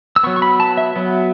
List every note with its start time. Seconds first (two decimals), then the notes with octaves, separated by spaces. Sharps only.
0.16 E6
0.23 F#3 B3 C#6
0.36 C#6
0.42 B5
0.60 A5
0.78 E5
0.96 F#3 B3